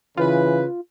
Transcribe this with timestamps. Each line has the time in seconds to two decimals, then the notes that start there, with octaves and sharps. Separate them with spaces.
0.17 C#3 E3 F4 B4